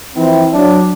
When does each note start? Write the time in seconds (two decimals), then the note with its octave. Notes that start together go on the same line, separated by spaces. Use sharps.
0.15 E3 F3 C4 E4
0.53 F#3 D4